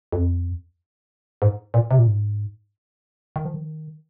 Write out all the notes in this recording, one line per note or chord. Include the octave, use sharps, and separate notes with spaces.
F2
G#2
A#2
C3
A#2
G#2
D#3
F3
D#3